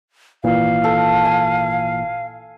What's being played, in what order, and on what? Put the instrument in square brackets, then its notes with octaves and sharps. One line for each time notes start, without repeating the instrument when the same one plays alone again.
[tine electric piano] G#1 A#2 E3 [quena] F5
[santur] A4
G#5